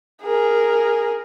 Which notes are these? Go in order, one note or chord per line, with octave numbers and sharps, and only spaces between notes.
G#4 A#4